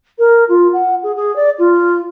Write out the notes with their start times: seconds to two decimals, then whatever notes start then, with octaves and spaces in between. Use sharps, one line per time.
0.19 A#4
0.49 F4
0.73 F#5
1.03 G#4
1.16 G#4
1.36 D5
1.59 F4